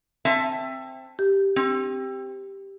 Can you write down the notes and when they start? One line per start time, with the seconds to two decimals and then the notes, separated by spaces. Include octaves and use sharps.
0.25 C4 E5 A5
1.19 G4
1.56 C4